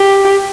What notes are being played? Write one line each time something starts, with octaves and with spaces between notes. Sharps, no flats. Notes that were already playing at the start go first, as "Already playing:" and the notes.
Already playing: G4